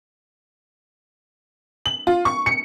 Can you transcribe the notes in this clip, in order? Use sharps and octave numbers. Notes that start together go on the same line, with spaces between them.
F#7
F4
C#6
C#7